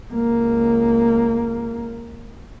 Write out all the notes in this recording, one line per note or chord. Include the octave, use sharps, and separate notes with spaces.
C#2 A#3